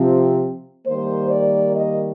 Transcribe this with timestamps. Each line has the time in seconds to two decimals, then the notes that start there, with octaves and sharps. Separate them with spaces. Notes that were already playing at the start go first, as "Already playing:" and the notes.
Already playing: C3 F3 C4
0.87 D#3 G3 A#3 C5
1.30 D5
1.74 D#5